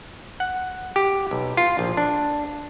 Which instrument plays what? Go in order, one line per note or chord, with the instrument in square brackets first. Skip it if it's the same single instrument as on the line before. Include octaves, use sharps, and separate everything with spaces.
[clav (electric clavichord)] F#5
G4
B1
F4
A#1
D4